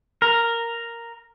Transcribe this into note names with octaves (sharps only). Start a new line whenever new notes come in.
A#4